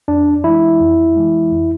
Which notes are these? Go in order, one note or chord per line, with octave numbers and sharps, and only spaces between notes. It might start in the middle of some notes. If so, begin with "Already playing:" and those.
F2 D4
E3 G#3 E4
F2
E3 G#3
F2